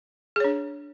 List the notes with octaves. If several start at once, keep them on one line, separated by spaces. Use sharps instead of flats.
D4 G#4 C#5